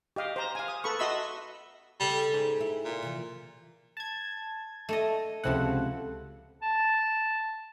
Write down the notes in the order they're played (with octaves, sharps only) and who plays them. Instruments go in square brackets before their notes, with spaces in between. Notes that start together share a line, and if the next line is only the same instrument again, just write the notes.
[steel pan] G4 D#5 F5
C5 A#5
F5 G#5
D#6
A4 B4 B5 C#6
F#4 D#5 E5 B5 C6 E6
[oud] C#3 A4 [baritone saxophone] G3
[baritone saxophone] G#2
[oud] E4
[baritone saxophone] A#2
[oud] C3 E3 F3
[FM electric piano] A5 G#6
[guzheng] A3 A4 D#5
[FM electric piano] C#2 C3 F#5 [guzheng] F3 A3 E4
[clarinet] A5